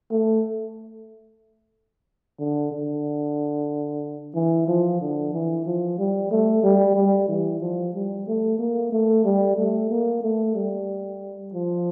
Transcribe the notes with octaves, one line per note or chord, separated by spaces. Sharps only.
A3
D3
D3
E3
F3
D3
E3
F3
G3
A3
G3
G3
E3
F3
G3
A3
A#3
A3
G3
A3
A#3
A3
G3
F3